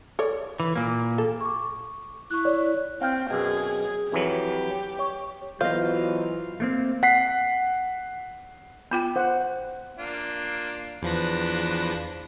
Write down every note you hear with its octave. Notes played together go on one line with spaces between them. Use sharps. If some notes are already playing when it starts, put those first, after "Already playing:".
A4 C#5 D5
E3
A#2 A#3
A4
C#6 D6
E4 C#6 F#6
C#5 D5
C4 F5 G5
F#2 B2 G#4
F2 E3 F#3 G4
C#5
E3 F#3 B3 F4 C5 D#5 F5
A3 A#3 C4
F#5 B6 C7
B3 F4 G5 B5
C5 F#5
A#3 D4 F4
E2 F3 D4 B4 A#6